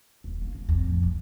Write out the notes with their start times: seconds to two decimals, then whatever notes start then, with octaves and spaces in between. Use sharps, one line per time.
0.24 D#1
0.41 A#3
0.55 F#1
0.69 F2
0.83 A2
1.03 A#1